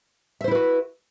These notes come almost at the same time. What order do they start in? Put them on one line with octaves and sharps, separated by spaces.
E5 C5 E4 B4 F#4